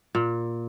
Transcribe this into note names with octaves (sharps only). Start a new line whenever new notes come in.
A#2